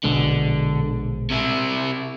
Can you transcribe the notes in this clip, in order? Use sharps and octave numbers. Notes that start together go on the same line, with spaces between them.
A#1 B2 D3 G#3
C3 E4